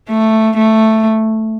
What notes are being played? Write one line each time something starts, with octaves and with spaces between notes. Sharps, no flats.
A3
A3